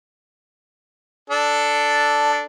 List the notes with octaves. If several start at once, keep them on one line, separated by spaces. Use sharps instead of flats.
D4 A4